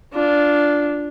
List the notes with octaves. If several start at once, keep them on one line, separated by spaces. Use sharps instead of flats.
D4 F4